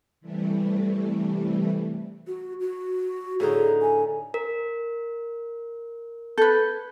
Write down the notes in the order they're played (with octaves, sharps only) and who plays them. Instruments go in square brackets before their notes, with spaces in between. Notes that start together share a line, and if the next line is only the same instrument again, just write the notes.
[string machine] C3 E3 G3 A3
[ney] F#4
F#4
[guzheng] A2 D3 D#4 [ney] G#4
[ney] G#5
[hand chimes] A#4
[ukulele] A4 B4 [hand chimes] G6 G#6